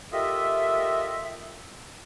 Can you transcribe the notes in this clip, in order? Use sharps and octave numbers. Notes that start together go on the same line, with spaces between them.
F4 G4 A4 A#4 D#5 E5